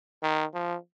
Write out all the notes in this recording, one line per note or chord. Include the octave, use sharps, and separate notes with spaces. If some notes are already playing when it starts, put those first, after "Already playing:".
D#3
F3